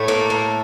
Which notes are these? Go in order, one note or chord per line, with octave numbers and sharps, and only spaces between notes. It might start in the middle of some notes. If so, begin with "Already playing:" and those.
Already playing: A2 A3
A#3
A#3